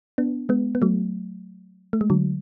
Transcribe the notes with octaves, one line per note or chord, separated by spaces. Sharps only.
B3 D4
G#3 B3
B3
F#3 A3
A3
G#3
D3 F#3